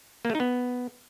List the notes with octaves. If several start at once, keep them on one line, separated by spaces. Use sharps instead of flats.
A#3
A3
D#4
B3